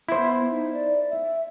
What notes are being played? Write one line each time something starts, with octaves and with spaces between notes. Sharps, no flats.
B3 E4 C5
D#4
D5
E5